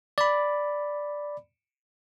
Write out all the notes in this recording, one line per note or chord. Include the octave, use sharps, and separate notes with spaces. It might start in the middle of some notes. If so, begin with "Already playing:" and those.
D5 B5